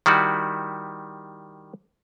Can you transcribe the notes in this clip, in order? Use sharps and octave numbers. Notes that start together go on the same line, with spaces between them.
D#3 G3 E4 F#4